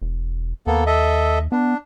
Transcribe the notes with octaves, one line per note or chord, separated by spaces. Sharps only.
E1
D#2 A#3 B3 A4
A4 D#5 E5
B3 D4